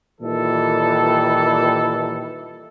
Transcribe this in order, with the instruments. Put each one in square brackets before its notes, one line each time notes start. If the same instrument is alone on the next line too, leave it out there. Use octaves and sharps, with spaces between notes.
[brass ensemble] A#2 D#3 E3 G3 A4